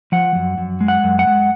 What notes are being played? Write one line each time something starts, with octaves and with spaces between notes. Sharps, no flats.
F3 F#5
F#2
F#2
G#3
F#5
F#2
F#5
G#3